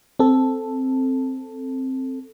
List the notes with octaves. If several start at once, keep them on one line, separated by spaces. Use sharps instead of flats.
C4 A4